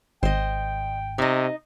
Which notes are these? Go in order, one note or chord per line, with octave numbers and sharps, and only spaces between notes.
G#1 C5 D#5 G5
C3 D#4 D#5